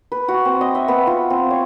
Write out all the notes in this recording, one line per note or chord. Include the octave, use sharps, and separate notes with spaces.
B4
F#4
C4
D#5
E5
B3
F4
C4
C#5